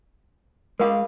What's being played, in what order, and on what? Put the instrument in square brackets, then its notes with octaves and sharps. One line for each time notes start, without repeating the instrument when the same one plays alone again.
[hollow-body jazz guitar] G#3 F5 [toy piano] F4 A#4